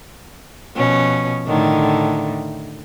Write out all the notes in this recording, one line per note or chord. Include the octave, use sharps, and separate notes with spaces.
B2 F3 C#4
A2 D3 D#3